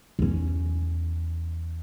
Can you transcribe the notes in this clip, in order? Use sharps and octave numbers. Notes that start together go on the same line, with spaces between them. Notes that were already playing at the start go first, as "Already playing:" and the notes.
E2 C#4